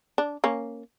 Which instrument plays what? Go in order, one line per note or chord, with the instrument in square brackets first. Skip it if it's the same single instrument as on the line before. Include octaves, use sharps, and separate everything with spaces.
[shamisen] D4
A#3 C#4